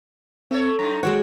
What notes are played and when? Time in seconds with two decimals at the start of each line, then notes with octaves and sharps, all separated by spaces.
0.51 A3 C4 A4 C#5
0.79 F#2 D#4 A#5
1.03 G#3 C4 F#4 C#5 F#5